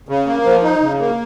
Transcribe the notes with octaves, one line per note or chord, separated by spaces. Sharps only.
C#3
A#3
F3
D#4
C#3
A#3